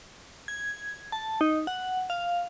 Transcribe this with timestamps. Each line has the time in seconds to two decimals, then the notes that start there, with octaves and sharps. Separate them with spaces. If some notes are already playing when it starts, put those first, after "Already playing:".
0.48 G#6
1.12 A5
1.41 D#4
1.67 F#5
2.10 F5